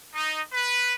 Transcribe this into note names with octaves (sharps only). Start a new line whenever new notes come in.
D#4
B4